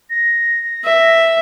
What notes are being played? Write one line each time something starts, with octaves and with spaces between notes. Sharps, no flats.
A#6
E5